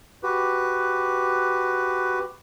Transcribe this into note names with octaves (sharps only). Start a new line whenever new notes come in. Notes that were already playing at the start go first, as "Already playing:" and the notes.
F#4 G4 B4